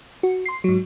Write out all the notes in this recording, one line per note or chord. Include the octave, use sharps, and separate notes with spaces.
F#4
C6 C7
G#2 F#3